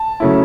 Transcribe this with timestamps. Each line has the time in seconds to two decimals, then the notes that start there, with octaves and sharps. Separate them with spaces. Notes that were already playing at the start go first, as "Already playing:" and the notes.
Already playing: A5
0.20 C#3 F#3 A3 C#4 E4